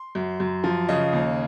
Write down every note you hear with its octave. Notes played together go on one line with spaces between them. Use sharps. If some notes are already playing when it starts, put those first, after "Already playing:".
Already playing: C6
F#2
F#2
F3
C#3 D#5
D#2